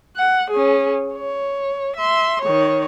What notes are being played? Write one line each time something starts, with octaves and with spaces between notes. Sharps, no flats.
F#5
C#4 G#4
C#5
E5 C6
D#3 C#5